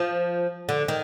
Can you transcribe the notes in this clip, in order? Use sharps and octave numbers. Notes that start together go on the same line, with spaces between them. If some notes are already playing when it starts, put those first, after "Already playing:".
Already playing: F3
D3
D#3